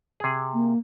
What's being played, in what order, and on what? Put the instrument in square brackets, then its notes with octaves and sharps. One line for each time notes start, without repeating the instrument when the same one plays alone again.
[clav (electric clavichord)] C3 G#4
[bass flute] A#3